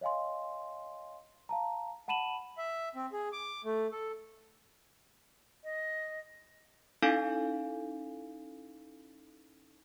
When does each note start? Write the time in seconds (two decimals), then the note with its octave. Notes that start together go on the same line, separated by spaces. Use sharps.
0.01 C#5 D#5 F5 G#5 C6
1.49 F5 A5 A#5
2.08 F#5 A5 B5 D#7 E7 F#7
2.57 E5
2.95 C4
3.13 G#4
3.33 D6
3.64 A3
3.92 A4
5.64 D#5
7.02 C#4 D#4 E4 A4 F5 G#5